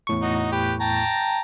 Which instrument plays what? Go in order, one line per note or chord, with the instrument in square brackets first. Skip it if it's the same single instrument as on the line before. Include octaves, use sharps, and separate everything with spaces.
[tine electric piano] E2 A2 C#6
[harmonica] D#4 F#4
G4 B4
G5 A5 A#5